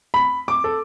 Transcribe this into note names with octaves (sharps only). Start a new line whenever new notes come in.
B5
D6
A4